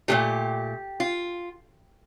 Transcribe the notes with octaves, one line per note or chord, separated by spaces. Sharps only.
A#2 F3 A3 G4
F4